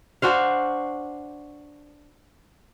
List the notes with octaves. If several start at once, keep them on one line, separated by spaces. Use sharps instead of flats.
D4 F#4 C5 F5